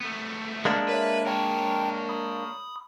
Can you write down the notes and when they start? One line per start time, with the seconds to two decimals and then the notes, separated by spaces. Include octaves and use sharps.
0.01 A3 B3
0.65 G#3 A#3 D4
0.89 A#4 B4 C#5 E5
1.27 A#4 C#5 G5 A5
2.09 B5 D#6